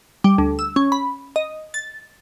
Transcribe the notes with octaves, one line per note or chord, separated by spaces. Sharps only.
G3
D2
E6
C#4
B5
D#5
A6